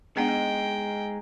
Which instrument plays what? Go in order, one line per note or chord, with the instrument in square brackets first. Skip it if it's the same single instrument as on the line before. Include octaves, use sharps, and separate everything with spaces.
[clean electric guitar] G#3 D#4 [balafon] B3 D4 F#5 [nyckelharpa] G5